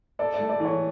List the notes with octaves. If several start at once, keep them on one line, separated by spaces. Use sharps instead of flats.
A4 D5
A3 D5
D5
E3
C#5